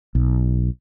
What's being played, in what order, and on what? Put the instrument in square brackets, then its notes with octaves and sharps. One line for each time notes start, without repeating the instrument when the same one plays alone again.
[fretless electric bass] B1